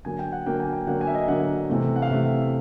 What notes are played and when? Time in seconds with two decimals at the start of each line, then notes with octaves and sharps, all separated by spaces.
0.05 D3 F#3 A#3 G#5
0.19 G5
0.32 F#5
0.46 D3 F#3 A#3 G5
0.60 G#5
0.73 G5
0.87 D3 F#3 A#3 F#5
1.01 G#5
1.07 E5
1.15 D#5
1.28 D3 F#3 A#3 F#5
1.70 C3 E3 A3
1.96 F#5
2.02 F5
2.10 C3 E3 A3 E5